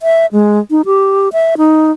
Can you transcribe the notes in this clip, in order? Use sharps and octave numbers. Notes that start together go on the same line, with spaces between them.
E5
G#3
D#4
G4
E5
D#4